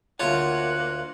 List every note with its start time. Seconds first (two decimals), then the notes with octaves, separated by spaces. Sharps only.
0.20 D2 A#3 F4 C#5 F#5 A5 F#6